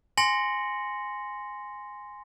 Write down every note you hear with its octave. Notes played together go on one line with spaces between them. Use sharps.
G#5 C6 A#6 C#7 F#7